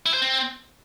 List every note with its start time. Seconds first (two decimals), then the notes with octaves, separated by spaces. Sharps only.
0.06 E4
0.14 C5
0.22 C4